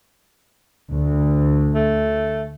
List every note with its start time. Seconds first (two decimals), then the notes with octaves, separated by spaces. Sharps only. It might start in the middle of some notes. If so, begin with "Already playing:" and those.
0.92 D2
1.75 A3